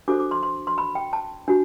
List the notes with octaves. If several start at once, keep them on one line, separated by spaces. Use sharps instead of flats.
D4 F#4 A4 C5 D6
D6
C6
C6
C6
B5
G5
A5
D4 F#4